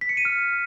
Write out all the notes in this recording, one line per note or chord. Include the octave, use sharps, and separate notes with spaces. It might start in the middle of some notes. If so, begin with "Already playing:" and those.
B6
C#7
D#7
F6